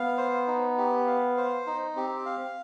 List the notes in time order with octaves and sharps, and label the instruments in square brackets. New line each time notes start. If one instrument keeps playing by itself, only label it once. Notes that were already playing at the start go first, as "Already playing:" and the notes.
Already playing: [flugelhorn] B3 [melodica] F5
[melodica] C5
D#4
G4
F5
C5
D#4
[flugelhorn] C4 [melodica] G4
[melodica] F5